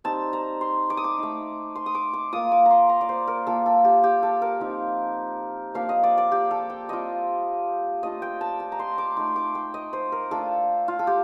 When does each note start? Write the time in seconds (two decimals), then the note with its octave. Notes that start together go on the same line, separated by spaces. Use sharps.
0.04 G3 C4 D#4 A5
0.33 A#5
0.61 C6
0.90 D6
0.97 D#6
1.04 D6
1.18 A3 D#4
1.76 C6
1.86 D#6
1.95 D6
2.13 D6
2.32 A#3 F4 D#6
2.52 D6
2.66 A#5
2.71 C6
2.89 A#5
3.01 D5
3.09 C5
3.27 A#4
3.47 A#3 F4 A4
3.66 A4
3.84 G4
4.04 G4
4.23 A4
4.42 A#4
4.60 F3 C4 D#4
5.74 F3 A#3 D4 F5
5.89 D#5
6.03 D5
6.18 D5
6.32 G4
6.51 A4
6.70 G5
6.89 G3 C4 F4 D#5
8.03 A3 D4 F4 D#5
8.22 G5
8.41 A5
8.60 A5
8.72 A#5
8.79 C6
8.98 D6
9.17 A3 D#4 C6
9.36 D6
9.55 G5
9.74 D#5
9.93 C5
10.12 A#4
10.31 A3 D4 F4 A4
10.88 F4
10.99 A4
11.07 G4